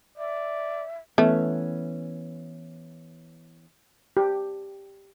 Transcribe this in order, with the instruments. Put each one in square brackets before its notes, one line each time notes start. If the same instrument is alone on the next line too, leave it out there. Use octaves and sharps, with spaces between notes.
[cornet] D5 [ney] E5
[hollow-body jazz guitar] E3 B3 C#4 [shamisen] A3
[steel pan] G4